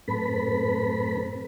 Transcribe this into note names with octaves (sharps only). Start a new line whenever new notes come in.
F#2 A2 C4 A4 B4 B5